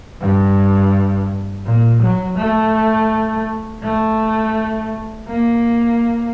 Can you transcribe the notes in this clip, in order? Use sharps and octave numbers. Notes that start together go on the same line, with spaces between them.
G2
A#2
F#3
A3
A3
A#3